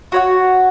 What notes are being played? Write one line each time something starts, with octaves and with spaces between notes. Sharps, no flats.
F#4 C#5 F#5